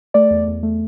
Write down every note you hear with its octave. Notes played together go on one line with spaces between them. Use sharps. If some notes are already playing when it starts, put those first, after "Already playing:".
A3 D5
E2
E2
A3